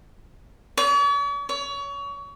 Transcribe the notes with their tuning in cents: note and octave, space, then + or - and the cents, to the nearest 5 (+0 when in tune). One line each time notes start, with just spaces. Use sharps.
C#5 +45
C#5 +30